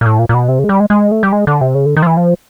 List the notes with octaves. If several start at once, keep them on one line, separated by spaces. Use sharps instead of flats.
A#2
A2
A#2
A#2
B2
C3
C#3
G#3
G3
G#3
G#3
A3
G3
G#3
D3
C3
C#3
D3
D#3
F3
E3
F3